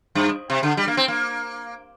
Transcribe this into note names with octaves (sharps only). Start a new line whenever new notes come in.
G2
C3
D3
G3
A#3
C4
A#3